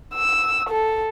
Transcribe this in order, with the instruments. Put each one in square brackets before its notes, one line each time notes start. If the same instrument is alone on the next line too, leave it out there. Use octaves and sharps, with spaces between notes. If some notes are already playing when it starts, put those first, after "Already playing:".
[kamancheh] E6
A4